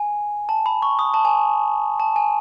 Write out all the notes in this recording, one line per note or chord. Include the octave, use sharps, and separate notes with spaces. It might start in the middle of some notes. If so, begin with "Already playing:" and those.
Already playing: G#5
A5
B5
C#6
D#6
A5
G#5
A5
G#5